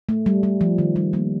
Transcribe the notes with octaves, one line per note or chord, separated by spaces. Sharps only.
A3
G3
G3
F3
D#3
G3
G3 A#3